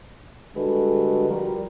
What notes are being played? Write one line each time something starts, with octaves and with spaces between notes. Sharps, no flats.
D3 G3 G#3 F#4 A4 B4
F3 G3 F4 F#4 A#4